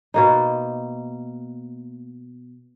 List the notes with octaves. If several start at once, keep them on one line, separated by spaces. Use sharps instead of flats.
B2 A#3 D#4